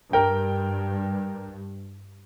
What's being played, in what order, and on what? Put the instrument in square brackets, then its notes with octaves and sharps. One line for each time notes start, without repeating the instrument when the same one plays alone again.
[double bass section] G2 [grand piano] A#4 G5